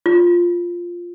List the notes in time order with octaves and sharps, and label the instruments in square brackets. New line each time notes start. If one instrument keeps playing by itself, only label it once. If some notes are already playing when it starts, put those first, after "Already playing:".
[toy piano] F4